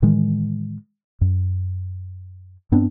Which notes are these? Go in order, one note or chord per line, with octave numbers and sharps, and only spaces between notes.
A2 D#3 E3 G#3
F#2
G2 B3 C4 D4